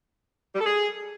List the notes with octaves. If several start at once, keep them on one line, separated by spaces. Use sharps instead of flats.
G3
A4
G#4